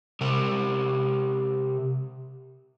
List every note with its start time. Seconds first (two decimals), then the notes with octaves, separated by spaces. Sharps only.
0.21 C3 A#4